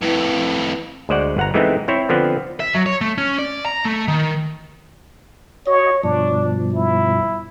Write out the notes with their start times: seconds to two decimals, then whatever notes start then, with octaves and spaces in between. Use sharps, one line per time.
0.02 F2 A2 E4 B4
1.09 D2 G#3 C5 D5 F#5
1.37 G1 F#5 A#5
1.54 E3 G#3 A3 B3 C4 D#4
1.88 C4 E4 C5 C#5
2.09 D3 F3 B3 C4
2.60 E5
2.75 F#3
2.86 C#5
3.01 A3
3.18 C#4
3.38 D5
3.66 A#5
3.85 A3
4.08 D#3
5.67 F#4 C#5 D#5
6.03 G2 B2 F3 D4
6.74 E4